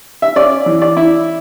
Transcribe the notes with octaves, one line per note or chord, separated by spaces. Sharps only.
E5
C#4 D5
E3
D5
E4